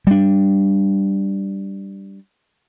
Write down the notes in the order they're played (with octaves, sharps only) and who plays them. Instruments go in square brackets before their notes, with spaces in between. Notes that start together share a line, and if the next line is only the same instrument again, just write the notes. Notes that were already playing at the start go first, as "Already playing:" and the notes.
[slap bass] G3 D4